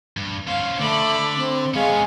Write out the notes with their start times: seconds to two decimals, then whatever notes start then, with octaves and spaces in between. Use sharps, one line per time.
0.17 G2
0.47 C#4 C5 F5
0.79 D3 A3 D5 B5
1.36 C4
1.74 G#3 B3 C#4 F5 C#6